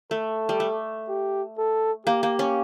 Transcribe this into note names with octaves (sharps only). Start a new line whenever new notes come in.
A3 A4
G3
A3
G4
A4
A#3 G4
A#3
C#4